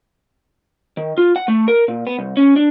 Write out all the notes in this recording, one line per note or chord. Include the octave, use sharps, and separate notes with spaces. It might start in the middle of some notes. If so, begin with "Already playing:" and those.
D#3
F4
F#5
A3
A#4
A#2
B3
C2
C#4
D4